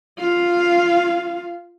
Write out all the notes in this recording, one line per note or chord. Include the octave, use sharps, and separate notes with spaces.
F4 F5